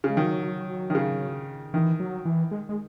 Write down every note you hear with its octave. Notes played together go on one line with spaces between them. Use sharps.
C#3
G#3
D#3 F#3
D#3
C#3
D#3 E3
F#3
E3
G#3
G#3